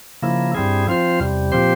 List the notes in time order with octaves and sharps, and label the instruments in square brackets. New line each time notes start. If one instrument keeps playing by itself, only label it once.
[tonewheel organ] C#3 F3 A#3 E4
G2 G3 C4 E4 G#4
F3 C4 F4 C5
E2 C3 G3
A#2 F3 C4 G4 C5